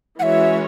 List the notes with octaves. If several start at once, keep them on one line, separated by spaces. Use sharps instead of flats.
E3 G#3 C#4 F#4 C#5 E5 F#5